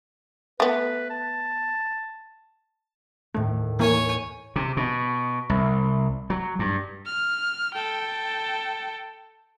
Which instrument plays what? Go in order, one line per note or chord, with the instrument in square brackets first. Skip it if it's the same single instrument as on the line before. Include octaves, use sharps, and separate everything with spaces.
[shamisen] A3 B3 [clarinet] B4
[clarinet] A5
[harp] D#2 A2 [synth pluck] A3
[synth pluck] E3 A#3 [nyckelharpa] C#5 G#5
[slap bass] C3
B2
C2
F#3
G2
[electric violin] F6
A4 G5